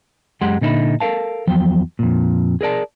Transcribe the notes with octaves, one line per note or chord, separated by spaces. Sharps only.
F#2 G#3 G4 F#5 C6
A#2 D3 D#4 G#4 E5 B5
A4 A#4 F5 A5
E2 F3 F#3 G5
F2 A#2
G#4 A#4 D5 A5